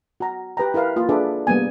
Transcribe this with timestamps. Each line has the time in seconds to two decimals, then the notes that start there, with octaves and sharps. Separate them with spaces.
0.20 F#4 A#5
0.57 G4 B4 G5 A#5
0.74 E4 A#4 B4 F5
0.96 A#3 F4
1.09 D4 G#4 A4 B4 D5 E5
1.47 G3 A#3 B3 G#5